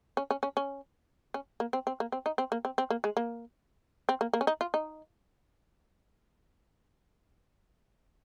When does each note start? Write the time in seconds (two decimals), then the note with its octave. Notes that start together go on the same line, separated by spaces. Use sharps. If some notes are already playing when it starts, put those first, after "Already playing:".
0.17 C#4
0.31 C#4
0.43 C#4
0.57 C#4
1.34 C#4
1.60 A#3
1.73 C4
1.87 C4
2.00 A#3
2.12 C4
2.26 D#4
2.38 C4
2.52 A#3
2.65 C4
2.78 C4
2.90 A#3
3.04 G#3
3.17 A#3
4.09 C4
4.21 A#3
4.33 A#3
4.41 C#4
4.47 D#4
4.61 F4
4.74 D#4